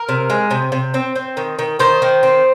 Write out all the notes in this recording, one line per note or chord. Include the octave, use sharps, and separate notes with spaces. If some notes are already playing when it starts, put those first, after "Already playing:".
Already playing: A#4
C3
G#3
C3
C3
C4
C4
D#3
D#3
D#3 C5
D#3
C4